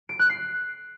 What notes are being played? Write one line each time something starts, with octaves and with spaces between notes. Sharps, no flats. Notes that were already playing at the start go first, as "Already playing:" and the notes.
D7
F#6
C7